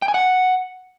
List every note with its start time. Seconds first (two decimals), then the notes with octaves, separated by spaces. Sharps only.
0.02 G5
0.08 G#5
0.14 F#5